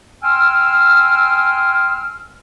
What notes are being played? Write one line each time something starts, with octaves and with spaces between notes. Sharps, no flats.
G5 G#5 C6 E6 F6